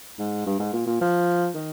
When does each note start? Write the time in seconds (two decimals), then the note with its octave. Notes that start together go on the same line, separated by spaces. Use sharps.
0.19 G#2
0.46 G2
0.59 G#2
0.73 A#2
0.87 A#2
1.01 F3
1.54 D#3